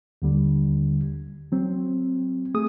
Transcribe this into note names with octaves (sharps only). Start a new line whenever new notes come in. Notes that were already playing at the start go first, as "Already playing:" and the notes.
D#2 D3 G3
F#3 C4
A3 G#4 D#6